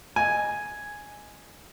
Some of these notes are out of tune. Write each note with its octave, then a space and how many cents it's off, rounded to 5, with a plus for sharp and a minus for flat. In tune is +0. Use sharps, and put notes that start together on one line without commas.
D#5 -15 G#5 +0